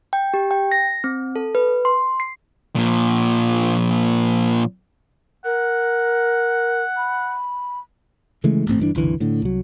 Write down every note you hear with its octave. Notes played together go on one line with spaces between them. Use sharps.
G5
G4
G5
A#6
C4
A4
B4
C6
C7
A#2 F3
A#4 F#5
B5
C#3 E3 G#3 A3
A1 G#2 A3 C4
G1 G2 E3 D4
F#1 C2 D3 E3
A2 D3
C2 F#3